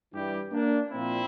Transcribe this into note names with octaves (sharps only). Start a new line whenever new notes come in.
G2 E3 G3 E4 G4
A#3 D4
A#2 F3 C4 E4